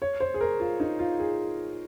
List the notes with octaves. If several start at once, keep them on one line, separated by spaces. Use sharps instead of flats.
C#5
C5
G#4
A#4
F4
D#4
F4
G#4